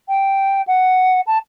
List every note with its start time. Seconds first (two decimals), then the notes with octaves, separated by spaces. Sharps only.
0.08 G5
0.67 F#5
1.27 A5